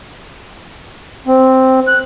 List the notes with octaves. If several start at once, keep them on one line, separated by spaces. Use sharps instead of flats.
C4
F#6